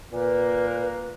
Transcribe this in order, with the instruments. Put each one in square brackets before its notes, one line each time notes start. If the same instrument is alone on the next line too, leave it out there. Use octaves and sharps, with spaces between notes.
[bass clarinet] A#2 [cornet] A#3 [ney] B4